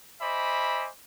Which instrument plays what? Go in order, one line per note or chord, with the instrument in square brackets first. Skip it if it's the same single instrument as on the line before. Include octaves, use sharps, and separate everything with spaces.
[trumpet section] C5 D#5 E5 G#5 B5 D6